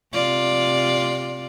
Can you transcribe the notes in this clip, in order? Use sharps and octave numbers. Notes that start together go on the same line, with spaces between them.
C3 F4 D5